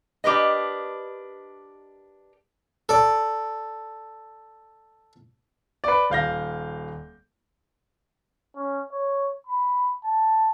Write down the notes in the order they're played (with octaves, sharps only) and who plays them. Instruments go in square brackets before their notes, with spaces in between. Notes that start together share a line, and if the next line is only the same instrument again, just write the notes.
[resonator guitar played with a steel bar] D4 G4 A#4 B4 D#5
[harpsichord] A4 D5
[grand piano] B4 D5
D#1 F5 G6 A#6
[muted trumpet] C#4
C#5
B5
A5